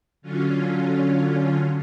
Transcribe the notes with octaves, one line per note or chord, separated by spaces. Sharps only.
D3 F#3 C#4 F4